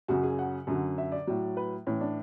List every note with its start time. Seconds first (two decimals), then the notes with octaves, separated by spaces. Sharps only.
0.08 F#2 C#3 F#3 F#4
0.23 G#4
0.39 F#5
0.67 F#2 D3 F#3
0.98 E5
1.12 D5
1.27 A2 F#3
1.57 B4
1.87 A2 E3 C#4
2.01 D4